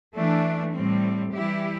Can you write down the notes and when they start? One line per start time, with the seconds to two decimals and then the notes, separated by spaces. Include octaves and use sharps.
0.14 E3 A3 D4
0.72 A2 G3 C4
1.31 E3 G3 E4 G4